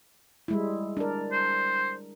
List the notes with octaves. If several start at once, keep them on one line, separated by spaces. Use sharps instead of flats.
G3 G#3 E4
D4 A#4
C5